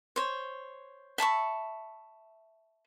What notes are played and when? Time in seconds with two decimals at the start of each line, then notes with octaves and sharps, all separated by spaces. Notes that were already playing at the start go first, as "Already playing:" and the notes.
0.16 C5 C#5
1.18 E5 A5 B5 C#6